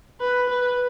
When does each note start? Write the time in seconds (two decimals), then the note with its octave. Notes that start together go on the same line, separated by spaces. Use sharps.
0.21 B4
0.49 B4